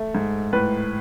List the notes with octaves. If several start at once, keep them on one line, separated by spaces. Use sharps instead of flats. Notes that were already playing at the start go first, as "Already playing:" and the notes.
Already playing: A3
G#2
A2 B4